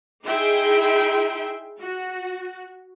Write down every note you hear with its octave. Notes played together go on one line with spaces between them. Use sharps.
D#4 E4 G#4 E5 G5 C6
F#4